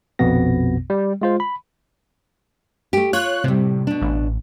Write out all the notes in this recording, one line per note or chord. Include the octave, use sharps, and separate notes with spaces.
A#1 F2 B2 B3 A#6
G3
G#3 F4 C5
B5
A3 G4
F4 C#5 F#6
A2 C3 G3
B2 D4
A1